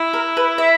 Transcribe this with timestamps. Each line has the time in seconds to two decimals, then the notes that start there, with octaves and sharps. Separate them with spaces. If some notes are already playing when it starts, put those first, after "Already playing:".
Already playing: E4
0.13 A#4
0.37 B4
0.58 E5